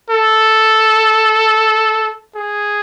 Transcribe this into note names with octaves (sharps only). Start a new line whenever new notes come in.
A4
G#4